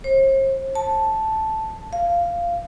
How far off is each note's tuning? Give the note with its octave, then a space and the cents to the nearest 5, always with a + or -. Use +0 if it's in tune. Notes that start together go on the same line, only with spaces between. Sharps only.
C5 +45
A5 -5
F5 -10